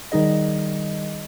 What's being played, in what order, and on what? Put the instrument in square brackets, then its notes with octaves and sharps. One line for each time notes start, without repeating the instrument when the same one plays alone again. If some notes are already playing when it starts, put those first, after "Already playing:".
[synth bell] D#3 G3 D#4 G#4 D#5